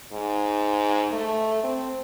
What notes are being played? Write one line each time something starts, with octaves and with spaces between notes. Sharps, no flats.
G#2
A3
C4